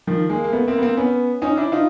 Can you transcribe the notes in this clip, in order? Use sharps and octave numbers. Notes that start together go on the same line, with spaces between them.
D#3 F3
G#3 A#3
A#3
A3 B3
A#3 C4
B3
A#3 C4
B3 C#4
C#4 D#4
D4 E4
D#4 F4